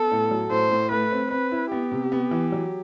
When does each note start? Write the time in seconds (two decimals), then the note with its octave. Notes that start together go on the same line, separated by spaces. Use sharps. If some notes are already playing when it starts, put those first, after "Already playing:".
Already playing: B3 A4
0.11 A2
0.31 F#3
0.50 A2 C5
0.71 A2
0.90 A3 B4
1.12 C4
1.31 C4 B4
1.52 E4
1.72 B3 G4
1.92 C3
2.12 B3
2.31 E3
2.52 F#3